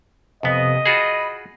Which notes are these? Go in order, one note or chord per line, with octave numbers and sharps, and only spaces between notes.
F2 C3 B3 D#5
F4 F#4 G#4 B5